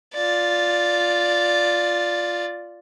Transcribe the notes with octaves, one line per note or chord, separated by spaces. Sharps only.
F4 D5